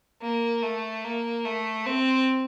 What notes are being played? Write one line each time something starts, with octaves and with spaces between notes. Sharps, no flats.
A#3
A3
A#3
A3
C4